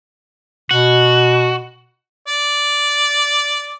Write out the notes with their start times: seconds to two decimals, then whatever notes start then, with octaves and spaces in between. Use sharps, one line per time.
0.71 B2 F#4
2.28 D5